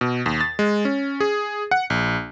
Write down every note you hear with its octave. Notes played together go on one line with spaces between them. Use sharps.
B2
D#2
A6
G#3
C#4
G#4
F#5
A#1